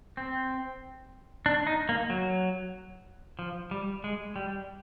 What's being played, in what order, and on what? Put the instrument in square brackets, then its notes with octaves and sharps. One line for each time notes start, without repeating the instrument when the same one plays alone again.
[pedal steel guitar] C4
D4
D#4
A#3
F#3
F3
G3
G#3
G3